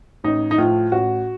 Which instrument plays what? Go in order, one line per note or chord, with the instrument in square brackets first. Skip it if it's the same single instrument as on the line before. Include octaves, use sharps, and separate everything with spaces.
[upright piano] A1 D#4
D#4
A2 F3 F4
A1 F#4